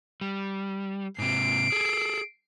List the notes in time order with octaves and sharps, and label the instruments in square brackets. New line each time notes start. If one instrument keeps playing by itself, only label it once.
[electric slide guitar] G3
[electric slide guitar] G#2 C3 [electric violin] C7 D7
[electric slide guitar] G#4 A4